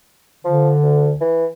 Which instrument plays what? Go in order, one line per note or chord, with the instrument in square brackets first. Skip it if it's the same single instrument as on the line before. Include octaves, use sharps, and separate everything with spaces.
[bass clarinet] D3 [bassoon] F3
[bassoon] D2
E3